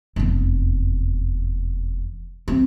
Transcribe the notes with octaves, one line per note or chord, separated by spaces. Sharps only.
F1 E2
C4